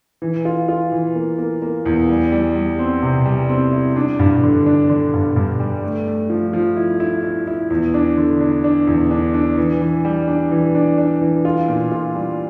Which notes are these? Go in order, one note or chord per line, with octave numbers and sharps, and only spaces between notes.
E3
F4
F4
E3
A#3
A#3
A#3
E2
G3
G3
G3
C4
C3
G3
C4
E4
D4
G2
D3
D4
D3
G2
G2
G3
A3
A3
F3
F3
E4
E4
E4
E4
E2
D4
D3
D4
D4
E2
D4
D4
E3
E3
G3
D4
E3
D4
D4
E3
F4
A#2
F4
G3